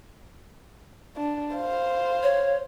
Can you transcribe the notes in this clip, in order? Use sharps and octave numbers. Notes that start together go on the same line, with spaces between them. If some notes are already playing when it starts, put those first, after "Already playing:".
D4
C5 F5
C#5